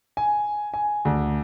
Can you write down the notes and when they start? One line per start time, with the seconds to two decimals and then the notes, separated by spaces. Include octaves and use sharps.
0.17 G#5
0.74 G#5
1.05 D2